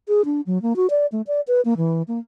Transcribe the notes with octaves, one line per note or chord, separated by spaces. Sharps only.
G#4
D4
F#3
A#3
F#4
D5
A3
D5
B4
A#3
E3
A#3